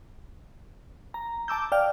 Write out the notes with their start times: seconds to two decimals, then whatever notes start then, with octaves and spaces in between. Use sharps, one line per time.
1.14 A#5
1.48 A5 D6 E6 G6
1.72 D5 F5 G5 F6